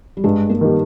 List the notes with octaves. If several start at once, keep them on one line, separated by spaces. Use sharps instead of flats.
G3
G2 G#3
A#3
D#3 G3